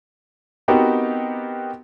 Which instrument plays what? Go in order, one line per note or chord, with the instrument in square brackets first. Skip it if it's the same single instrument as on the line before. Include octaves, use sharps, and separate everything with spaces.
[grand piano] B3 C4 D#4 F#4 G4 A#4